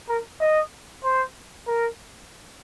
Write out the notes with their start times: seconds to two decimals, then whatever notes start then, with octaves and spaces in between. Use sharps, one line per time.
0.09 A#4
0.41 D#5
1.04 C5
1.67 A#4